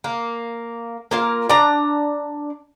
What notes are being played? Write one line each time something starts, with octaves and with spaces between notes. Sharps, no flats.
A#3
A#3 F4 A#4
D4 A#5